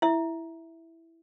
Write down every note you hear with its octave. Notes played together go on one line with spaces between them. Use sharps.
E4 E5